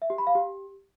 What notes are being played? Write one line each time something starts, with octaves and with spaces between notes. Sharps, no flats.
E5
G4
B5
F5
G4